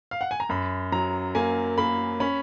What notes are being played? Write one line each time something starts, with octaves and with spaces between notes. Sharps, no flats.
F5
F#5
G#5
A#5
F#2 B5
F#3 A#5
A#3 G#5
A#3 B5
C#4 B5